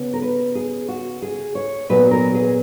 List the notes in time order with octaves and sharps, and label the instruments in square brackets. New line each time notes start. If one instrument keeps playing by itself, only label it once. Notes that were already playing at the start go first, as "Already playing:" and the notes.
Already playing: [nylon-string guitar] C#3 B3
A#4
B4
G#4
F#4
G#4
C#5
A#2 F#3 B3 B4
A#4
G#4